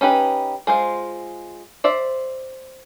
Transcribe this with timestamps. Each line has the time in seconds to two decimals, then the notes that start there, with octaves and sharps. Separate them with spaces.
0.01 C#4 D#4 G4 B4
0.67 G#3 F4 C5
1.84 C5 D5 E5